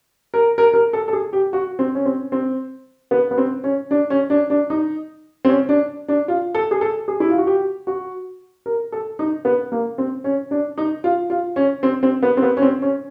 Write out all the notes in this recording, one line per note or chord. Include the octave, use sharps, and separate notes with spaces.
A#4
A#4
A#4
A4
A4
G#4
G4
F#4
C4
C#4
C4
C4
B3
B3
C4
C#4
D4
C#4
D4
D4
D#4
C4
C#4
D4
D4
F4
A4
G#4
A4
G#4
E4
F4
F#4
G4
F#4
A#4
A4
D#4
B3
A#3
C4
C#4
D4
D#4
F4
F4
C#4
C4
C4
B3
C4
B3
C#4
C4
C#4